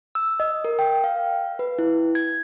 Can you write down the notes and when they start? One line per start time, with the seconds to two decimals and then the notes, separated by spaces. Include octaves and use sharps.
0.15 E6
0.40 D#5
0.65 A#4
0.79 G5
1.04 F5
1.59 B4
1.79 E4
2.15 G#6